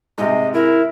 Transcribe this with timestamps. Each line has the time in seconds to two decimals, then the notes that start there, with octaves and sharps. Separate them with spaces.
0.18 G#2 C3 D#5
0.54 E4 A#4